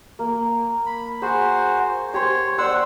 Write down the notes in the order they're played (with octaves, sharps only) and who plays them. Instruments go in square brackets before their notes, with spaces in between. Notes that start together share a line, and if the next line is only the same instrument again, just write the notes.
[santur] A#3
[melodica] B5
[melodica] F#4 C5 [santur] G#4
[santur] G4 C5 [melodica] C#5
[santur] C5 D5 C6 [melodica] F#5 E6